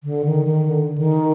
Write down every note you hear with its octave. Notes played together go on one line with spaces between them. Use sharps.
D3
D#3
D#3
D3
D#3